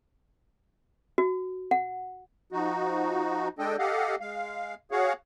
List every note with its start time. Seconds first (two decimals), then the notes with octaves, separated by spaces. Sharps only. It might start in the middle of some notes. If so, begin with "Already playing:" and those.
1.18 F#4
1.71 F#5
2.52 F3 D#4 F#4
3.59 G#3 D4 A4 D#5 G5
3.79 G4 A4 D#5 F5 F#5
4.21 G#3 F5
4.92 F#4 G#4 C#5 F5 F#5